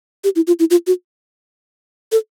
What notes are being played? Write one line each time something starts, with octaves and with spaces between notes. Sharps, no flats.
G4
E4
F4
E4
F4
F#4
A4